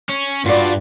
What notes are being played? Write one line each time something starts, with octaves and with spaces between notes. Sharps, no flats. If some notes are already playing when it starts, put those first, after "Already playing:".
C#4
G2 F4 F#4 D5